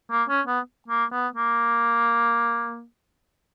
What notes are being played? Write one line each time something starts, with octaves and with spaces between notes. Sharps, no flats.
A#3
C#4
B3
A#3
B3
A#3